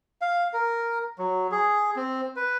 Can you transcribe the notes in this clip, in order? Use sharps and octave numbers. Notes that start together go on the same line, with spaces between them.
F5
A#4
F#3
G#4
C4
B4